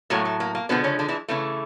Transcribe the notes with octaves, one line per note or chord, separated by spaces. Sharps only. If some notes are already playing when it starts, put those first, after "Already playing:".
A2 F#3 A3 A#3
A3
A#3
A#3
B2 D3 F3 G#3 B3
C#3 C#4
D3 D4
E3 E4
C#3 E3 A3